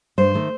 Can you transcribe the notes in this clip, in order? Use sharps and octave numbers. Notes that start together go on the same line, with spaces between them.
G2 C5
D#3 A3